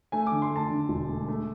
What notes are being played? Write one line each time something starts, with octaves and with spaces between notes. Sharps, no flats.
A3 G#5
D3 D6
C6
A3 A5
D3
E1
A3
A3